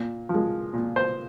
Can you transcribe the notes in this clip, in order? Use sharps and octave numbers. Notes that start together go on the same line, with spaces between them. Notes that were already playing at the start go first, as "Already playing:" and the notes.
Already playing: A#2
F3
G#3
A#2
C5